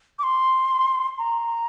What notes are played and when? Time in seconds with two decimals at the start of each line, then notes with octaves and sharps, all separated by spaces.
0.19 D6
0.23 C6
1.18 A#5